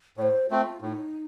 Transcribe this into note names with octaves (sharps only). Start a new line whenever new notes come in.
A2 C5 C#5
A3 C4 F4
A2 D#4